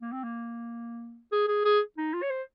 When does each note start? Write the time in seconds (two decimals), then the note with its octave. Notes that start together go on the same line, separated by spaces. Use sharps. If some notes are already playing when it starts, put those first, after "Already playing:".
0.01 A#3
0.12 C4
0.24 A#3
1.32 G#4
1.48 G#4
1.65 G#4
1.98 D#4
2.14 F4
2.22 C#5
2.30 C5